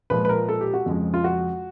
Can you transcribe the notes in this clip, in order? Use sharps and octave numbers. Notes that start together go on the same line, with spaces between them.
A#2 F3 G#3 B4
B4
A#4
A4
G4
F#4
F2 C#3 F3 G#3
F4
F#4